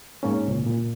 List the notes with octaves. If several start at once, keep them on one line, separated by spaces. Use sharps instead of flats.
G#2 A#3 C#4
C#2 A#2
A#2